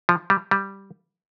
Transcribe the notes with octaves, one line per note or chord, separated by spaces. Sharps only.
F3
G3
G3